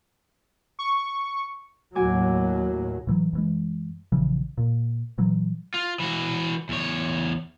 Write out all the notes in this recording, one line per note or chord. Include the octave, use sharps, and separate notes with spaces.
C#6
D#2 A2 F#3 F#4 G#5 D6
A2 E3 F#3
F#2 E3 G#3
A#1 C#3 E3 F3
A#2
A#2 E3 F#3
F4
E3 F#4
E2 C#5